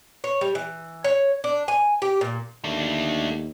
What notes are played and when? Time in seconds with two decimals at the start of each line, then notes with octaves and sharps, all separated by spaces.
0.24 C#5
0.41 G3
0.55 E3
1.04 C#5
1.44 D4
1.68 G#5
2.02 G4
2.21 A#2
2.64 D#2 A3 D4